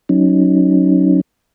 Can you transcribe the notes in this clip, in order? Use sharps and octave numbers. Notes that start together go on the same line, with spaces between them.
F#3 C#4 D#4